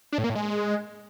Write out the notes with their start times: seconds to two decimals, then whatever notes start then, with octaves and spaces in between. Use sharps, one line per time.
0.12 D4
0.18 A2
0.24 A#3
0.30 A2
0.35 G#3